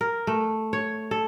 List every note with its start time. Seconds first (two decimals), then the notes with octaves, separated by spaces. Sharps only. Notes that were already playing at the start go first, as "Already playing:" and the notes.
0.01 A#4
0.27 A3
0.73 C#5
1.11 A4